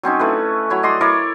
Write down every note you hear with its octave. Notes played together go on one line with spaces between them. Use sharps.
F#3 C4 C#4 D#4
A3 E4 B4
F#3 E4 C#5
D5 D#5 C6 D6
E4 A#4 C#5 D5